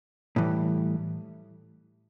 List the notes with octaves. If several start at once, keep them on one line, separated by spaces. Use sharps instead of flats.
A2 E3 G3